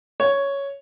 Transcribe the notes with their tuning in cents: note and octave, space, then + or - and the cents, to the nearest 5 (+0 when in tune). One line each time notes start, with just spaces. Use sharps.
C#5 +5